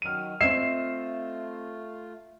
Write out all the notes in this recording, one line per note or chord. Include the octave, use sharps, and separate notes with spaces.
D#3 F#3 F6 D#7
A3 C4 F4 D#5 E5 C7